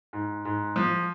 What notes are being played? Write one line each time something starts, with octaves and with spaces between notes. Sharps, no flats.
G#2
G#2
F3